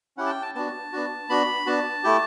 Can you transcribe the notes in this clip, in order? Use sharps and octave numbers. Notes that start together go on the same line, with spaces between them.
C#4 E4 G4 F#5
A5
G5
A5
B3 D4 F#4 A5
B3 D4 F#4
B3 D4 F#4 B5
B3 D4 F#4 A5
A3 E4 G4